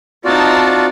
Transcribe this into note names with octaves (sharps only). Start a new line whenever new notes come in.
C4 D#4 F4 F#4 D5 A5